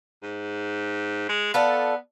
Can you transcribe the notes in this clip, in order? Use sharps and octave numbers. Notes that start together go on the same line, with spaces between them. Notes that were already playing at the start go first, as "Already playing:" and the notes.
G#2
G#3
B3 F4 A4 D5